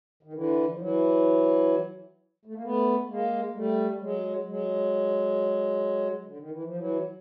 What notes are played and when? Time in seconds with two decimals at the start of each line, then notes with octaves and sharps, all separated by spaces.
0.23 D#3
0.33 D3 E3
0.73 F3
0.78 E3 F#3
2.45 A3
2.54 A#3
2.63 A3 B3
3.08 G#3 A#3
3.55 G3 A3
4.01 F#3 G#3
4.47 F#3 G#3
6.25 D3
6.37 D#3
6.50 E3
6.64 F3
6.76 E3 F#3